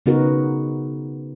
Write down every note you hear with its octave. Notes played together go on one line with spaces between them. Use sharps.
C#3 B3 D#4 F#4 A#4